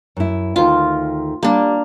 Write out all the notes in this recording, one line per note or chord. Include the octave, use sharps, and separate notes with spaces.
F#2 E4
D2 D#3 F4
G3 A#3 D4